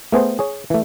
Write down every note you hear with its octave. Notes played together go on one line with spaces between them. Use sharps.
A3 B3 G#4 C5
G#4 C#5
E3 A3